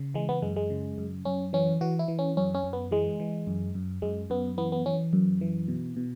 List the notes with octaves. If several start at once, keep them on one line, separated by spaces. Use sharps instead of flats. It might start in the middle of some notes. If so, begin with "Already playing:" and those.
Already playing: C#3
E3 G#3
B3
F#2 G#3
G#3
C#3
F#2
F#2 C#4
E3 C#4
E3 F#4
E4
E3
C#4
F#2 C#4
C#4
F#2
B3
E3 G#3
E3
F#2
F#2
F#2 G#3
F#2 B3
E3 B3
B3
E3 C#4
F#2
E3
B2
B2